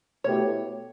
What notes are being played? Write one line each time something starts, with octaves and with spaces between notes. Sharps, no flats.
B2 A3 E4 G4 C#5